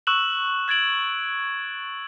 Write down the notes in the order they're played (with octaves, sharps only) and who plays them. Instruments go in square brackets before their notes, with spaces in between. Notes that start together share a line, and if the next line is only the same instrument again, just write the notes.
[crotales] C#6 E6 F#6 E7 F#7
F#6 G#6 A6 D7 F#7